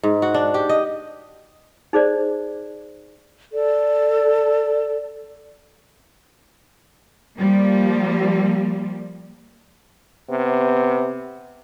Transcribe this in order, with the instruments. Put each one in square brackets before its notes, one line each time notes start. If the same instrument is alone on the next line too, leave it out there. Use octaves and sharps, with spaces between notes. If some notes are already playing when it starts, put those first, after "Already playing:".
[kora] G#2
F#4
D4
G4
D#5
[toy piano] D#4 G#4 C5 D5
[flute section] A4 D5
[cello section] F3 G3 A#3
[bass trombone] C3 [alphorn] B3